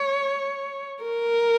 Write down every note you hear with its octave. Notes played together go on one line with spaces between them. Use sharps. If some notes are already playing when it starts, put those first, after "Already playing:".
Already playing: C#5
A#4